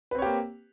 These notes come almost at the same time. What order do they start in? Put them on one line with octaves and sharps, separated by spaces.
B4 C4 C#5 G4 A#3